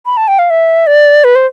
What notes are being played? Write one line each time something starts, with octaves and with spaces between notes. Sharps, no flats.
B5
A5
G5
F5
E5
D5
B4
C5